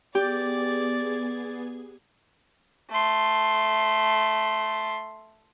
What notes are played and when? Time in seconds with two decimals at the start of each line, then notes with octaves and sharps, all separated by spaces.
0.15 B3 G4 G#4 D5 G#6 A6
2.91 A3 C6